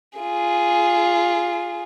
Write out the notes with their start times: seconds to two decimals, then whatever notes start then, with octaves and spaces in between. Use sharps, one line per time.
0.19 F4 G#4